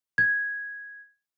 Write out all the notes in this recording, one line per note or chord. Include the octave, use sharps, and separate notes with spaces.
G#6